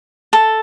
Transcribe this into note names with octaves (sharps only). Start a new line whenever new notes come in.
A4